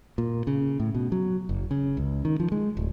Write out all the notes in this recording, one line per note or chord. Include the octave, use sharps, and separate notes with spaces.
A#2
C#3
A2
B2
F#3
F#1
C#3
C#2
D#3
F3
G#3
D1